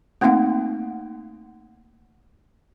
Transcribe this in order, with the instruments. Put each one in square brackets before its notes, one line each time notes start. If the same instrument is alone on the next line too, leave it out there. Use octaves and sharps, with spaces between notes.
[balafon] A3 A#3 C4 D#4 F5 F#5